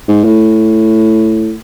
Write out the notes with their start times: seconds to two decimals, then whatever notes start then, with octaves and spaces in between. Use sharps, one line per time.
0.08 G#2
0.24 A2